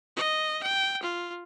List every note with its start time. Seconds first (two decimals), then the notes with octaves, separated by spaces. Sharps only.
0.17 D#5
0.63 G5
1.03 F4